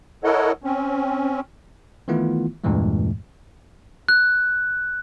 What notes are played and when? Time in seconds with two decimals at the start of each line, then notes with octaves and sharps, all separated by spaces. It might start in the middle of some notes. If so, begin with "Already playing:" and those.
0.24 E4 A4 A#4 C#5 D#5 F#5
0.64 C4 C#4
2.08 D#3 E3 A3 B3 E4 F4
2.63 E2 G2 A#2 E3 G#3 A3
4.09 F#6